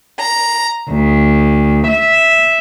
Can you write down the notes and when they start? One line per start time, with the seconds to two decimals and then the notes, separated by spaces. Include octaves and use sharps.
0.21 A#5
0.89 D2
1.88 E5